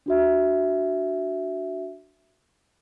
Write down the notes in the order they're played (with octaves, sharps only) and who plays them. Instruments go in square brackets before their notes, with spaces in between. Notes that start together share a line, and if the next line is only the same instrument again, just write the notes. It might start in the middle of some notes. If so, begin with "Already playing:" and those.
[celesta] D4 F#4 E5